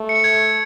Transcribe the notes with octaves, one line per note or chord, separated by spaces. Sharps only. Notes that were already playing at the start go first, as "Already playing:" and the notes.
Already playing: A3
C#7
G#6